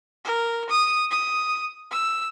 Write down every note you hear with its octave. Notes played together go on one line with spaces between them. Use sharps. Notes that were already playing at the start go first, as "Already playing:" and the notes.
A#4
D#6
D#6
E6